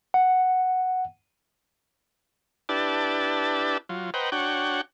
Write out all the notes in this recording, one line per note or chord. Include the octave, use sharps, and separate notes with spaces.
F#5
D4 E4 G4 B4 D5 A5
F#3 F4
B4 C5 D#5 F#5 G5 A#5
D4 F#4 C#5 F#5 G5